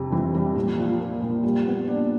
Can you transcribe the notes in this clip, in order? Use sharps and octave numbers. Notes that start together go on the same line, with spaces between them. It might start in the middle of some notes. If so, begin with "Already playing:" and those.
Already playing: F2 C3
E3
G3
A#2
F3
A#3
A#2
G3
B3
D4